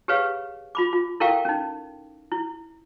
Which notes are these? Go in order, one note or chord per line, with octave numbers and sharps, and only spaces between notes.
G4 G#4 B4 C#5 F5
F4 B5 D6
F4
E4 A4 A#4 F5 G5 C#6
C#4 D#4
E4